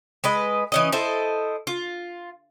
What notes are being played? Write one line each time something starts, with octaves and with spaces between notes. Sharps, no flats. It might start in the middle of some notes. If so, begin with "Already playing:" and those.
G#3 B4 D#5
E3 C#4 D#5
E4 A4 C5 D#5
F4